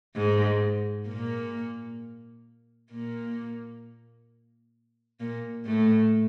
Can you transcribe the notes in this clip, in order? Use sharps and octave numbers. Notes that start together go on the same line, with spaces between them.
G#2 G#3
A#2 A#3
A#2 A#3
A#2 A#3
A2 A3